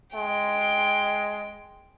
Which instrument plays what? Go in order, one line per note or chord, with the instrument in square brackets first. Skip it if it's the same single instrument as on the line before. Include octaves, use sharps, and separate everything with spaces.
[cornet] G#3 [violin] G5